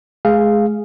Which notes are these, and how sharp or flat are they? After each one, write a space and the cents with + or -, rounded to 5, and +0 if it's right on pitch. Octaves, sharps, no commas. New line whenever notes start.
G#3 +35 G#4 +0 F5 -5